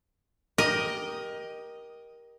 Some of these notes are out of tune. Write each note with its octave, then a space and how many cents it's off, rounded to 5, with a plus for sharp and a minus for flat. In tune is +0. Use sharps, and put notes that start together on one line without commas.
G4 +0 A#4 +20 D#5 +0